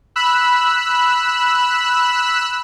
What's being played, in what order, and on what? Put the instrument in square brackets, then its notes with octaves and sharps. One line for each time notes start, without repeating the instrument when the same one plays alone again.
[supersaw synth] B5 E6 F#6